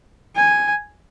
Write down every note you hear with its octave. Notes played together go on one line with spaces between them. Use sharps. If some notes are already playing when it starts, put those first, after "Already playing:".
G#5